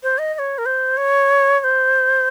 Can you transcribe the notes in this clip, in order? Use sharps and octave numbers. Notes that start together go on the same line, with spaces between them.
C5
D#5
D#5
C#5
A#4
C5
C#5
C#5
C5